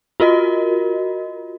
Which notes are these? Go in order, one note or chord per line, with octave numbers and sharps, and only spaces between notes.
F4 F#4 A#4 D#5